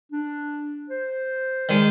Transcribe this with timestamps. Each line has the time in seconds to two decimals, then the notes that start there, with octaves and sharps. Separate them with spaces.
0.12 D4
0.90 C5
1.69 D#3 G#3